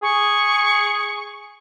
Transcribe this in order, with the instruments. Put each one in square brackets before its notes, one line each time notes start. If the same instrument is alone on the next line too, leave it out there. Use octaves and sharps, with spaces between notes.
[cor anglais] G#4 [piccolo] C#6